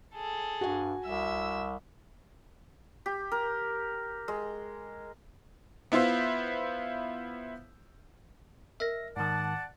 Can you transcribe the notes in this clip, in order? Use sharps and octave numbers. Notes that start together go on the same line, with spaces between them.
G#4 A4
G2 F#4 G#5
C2 E5 E6
G4
A#4
G#3
B3 E4 F4 C5 E5
A#4 D#5 E5 A#6
G#2 D#3 D5 F#5 A5